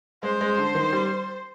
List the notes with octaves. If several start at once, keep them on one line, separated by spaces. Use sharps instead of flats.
G#3 C5
G#3
D3
D#3
G3